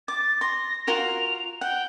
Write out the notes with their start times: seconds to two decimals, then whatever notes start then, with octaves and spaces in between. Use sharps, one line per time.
0.08 D6 A6
0.41 C6 A#6
0.87 F4 F#4 A#4 F7
1.61 F#5 G5